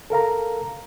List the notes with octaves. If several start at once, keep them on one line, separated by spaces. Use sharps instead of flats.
A4 A#4 F5 A#5